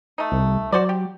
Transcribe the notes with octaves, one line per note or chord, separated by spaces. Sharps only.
A3 D#4
C2
F#3 F#4 C5 D5
G4